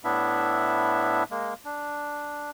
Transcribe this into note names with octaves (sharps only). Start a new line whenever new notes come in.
A2 B3 D4 E4 E5
G#3 A#3
D4